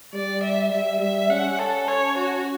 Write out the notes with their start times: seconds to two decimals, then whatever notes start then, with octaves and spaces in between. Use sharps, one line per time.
0.14 G3 D5
0.43 E5
0.72 G3 E5
1.00 G3 E5
1.30 C#4 F#5
1.59 A4
1.88 C#5
2.17 F#4